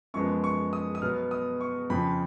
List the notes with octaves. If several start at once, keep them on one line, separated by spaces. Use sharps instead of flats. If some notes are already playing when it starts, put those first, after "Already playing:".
F#2 F3 G#3 B3 C#6
C#6
D#6
D#6
B2 F#3 B3 F6
D#6
C#6
F2 C#3 F3 B5